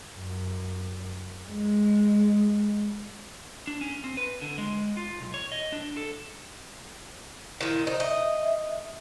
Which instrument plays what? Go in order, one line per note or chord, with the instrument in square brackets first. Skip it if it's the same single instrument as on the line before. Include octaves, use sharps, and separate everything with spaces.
[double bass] F#2
G#3
[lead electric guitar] D4
C#4
C4
B4
D3
G#3
F4
B1
C#5
D#5
D4
A4
[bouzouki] A#2 D#3 [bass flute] E4
[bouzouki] D#4 [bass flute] C5
[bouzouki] D#5 [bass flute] E5